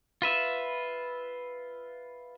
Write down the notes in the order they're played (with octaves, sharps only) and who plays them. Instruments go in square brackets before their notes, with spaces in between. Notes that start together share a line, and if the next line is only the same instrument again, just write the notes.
[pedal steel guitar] F4 B4 E5